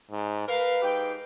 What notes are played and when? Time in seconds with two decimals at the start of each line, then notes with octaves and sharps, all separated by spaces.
0.11 G#2
0.48 A#4 B4 F5
0.82 G#2 G4 G5